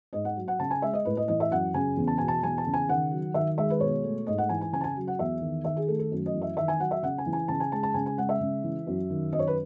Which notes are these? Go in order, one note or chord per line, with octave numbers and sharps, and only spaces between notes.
G#2 D#5
F#5
F#3
F#5
C#3 A5
G#5
G#3 E5
D#5
A2 B4
D#5
E3 D#5
E5
F#2 F#5
C#3 G#5
E2
A5
B2 G#5
A5
E2 G#5
A5
C#3
G#5
D#3 F#5
F#3
D#3 E5
G#3 E5
B4
B2 C#5
A3
G#2 D#5
F#5
E3 G#5
G#5
C#3 G#5
A5
G#5
F#3
F#5
E2 E5
D#3
D#3 E5
G#4
A3 A4
A4
F#2
D#5
E3
E5
D#3 E5
G#5
F#3 F#5
E5
C#3 F#5
G#5
E3
G#5
C#3 A5
G#5
G#3 A5
A5
C#3 G#5
G#5
G#3 F#5
E5
C#3
E3
F#2
D#3
F#2 D#5
C#5
B4